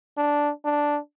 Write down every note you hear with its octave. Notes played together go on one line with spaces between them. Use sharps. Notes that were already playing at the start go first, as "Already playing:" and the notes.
D4
D4